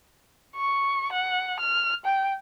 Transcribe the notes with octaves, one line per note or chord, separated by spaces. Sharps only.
C#6
F#5
F6
G5